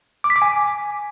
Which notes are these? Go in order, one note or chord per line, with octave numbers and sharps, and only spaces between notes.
D6
B6
D6
G#5